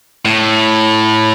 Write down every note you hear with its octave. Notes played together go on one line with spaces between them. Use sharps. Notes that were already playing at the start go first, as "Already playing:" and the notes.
A2